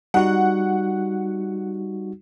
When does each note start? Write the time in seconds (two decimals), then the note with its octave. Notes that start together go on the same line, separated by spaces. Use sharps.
0.14 G3 D#4 F#4 F#5